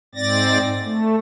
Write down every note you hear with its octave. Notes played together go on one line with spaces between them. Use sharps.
G#2 C4 D5 A6 A#6
A3